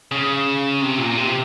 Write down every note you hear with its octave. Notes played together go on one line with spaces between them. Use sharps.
C#3
C3
A#2
C3